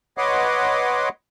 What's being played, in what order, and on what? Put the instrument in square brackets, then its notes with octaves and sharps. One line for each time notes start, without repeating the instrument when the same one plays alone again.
[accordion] B4 C#5 D#5 F#5 C6 D6